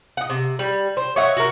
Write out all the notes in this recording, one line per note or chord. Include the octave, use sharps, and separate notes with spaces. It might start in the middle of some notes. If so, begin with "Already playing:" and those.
D#5 F#5
C3
G3
C5
C#5 D#5 E5 F#5
F#4 A#4